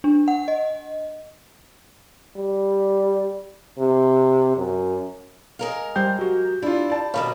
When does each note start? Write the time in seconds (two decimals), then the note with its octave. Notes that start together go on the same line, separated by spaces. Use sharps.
0.04 D4
0.28 F#5
0.48 D#5
2.36 G3
3.79 C3
4.57 F#2
5.59 G#3 A#4 F5
5.96 G3 C5 G5 G6
6.19 F#3 F#4 G4
6.62 D4 E4 F4
6.90 D5 A5
7.14 B2 D#3 G3 C#5 F5 B5